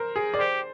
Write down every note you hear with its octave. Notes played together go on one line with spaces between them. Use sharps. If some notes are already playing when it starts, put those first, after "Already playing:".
Already playing: A#4 C5
G#4
D5
G4 C5